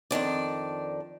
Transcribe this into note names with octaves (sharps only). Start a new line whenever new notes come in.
F2 D#3 D4 D5